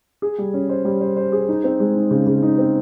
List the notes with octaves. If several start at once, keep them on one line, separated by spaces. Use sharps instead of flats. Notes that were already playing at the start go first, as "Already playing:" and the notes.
G#4
G3
C#4
C5
G3
C5
C5
G#4
D#4
C4
G#3
D#4
C#3
C#3
D#4
C4